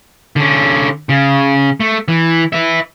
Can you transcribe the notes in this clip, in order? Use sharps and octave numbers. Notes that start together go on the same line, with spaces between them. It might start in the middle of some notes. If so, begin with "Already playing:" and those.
D3 C#4
C#3
A3
E3
B4 E5